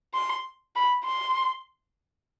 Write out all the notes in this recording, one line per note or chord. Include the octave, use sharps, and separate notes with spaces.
C6
B5
C6